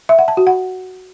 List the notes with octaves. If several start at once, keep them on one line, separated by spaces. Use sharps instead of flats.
E5
F#5
A5
F#4
F#5